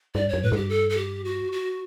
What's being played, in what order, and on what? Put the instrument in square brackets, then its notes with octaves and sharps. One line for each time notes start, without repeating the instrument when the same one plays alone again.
[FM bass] G2 [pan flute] D5
[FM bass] F#2 [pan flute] C#5
[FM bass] A2 [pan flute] B4
[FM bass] G2 [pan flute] A4
[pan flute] G4
A4
A4
G4
F#4
F#4